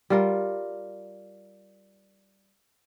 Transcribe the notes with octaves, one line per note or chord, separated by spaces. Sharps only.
G3 F4 A#4